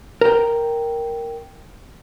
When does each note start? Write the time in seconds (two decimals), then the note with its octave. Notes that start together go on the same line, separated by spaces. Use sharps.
0.21 A#4 G5